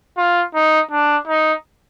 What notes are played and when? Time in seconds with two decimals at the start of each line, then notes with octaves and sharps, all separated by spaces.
0.17 F4
0.54 D#4
0.91 D4
1.27 D#4